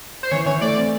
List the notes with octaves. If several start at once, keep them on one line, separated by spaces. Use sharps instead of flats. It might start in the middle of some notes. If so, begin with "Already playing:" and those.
C5
E3 C#5
E3 C#5
A3 D5
C4